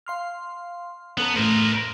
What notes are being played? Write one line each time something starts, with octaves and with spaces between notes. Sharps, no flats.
F5 C6 F6
B3 C#4 A4 A#5
A2 A3 A#4 C5